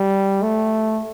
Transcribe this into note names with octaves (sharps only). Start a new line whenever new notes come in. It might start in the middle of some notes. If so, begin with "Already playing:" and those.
Already playing: G3
A3